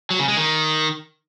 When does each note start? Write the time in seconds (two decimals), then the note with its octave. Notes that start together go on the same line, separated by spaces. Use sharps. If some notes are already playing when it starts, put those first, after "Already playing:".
0.10 F#3
0.19 C#3
0.28 G#3
0.37 D#3